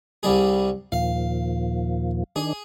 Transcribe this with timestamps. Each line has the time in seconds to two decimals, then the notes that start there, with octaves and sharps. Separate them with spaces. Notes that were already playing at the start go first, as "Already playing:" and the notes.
0.23 C2 G3 G#4
0.92 D#2 A#2 F3 F5
2.36 D#3 D4 G#4